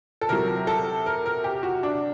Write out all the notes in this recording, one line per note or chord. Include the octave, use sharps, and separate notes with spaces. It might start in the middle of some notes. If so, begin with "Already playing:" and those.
A4
C3 F#3 A#4
A4
A#4
A#4
G4
F#4
D4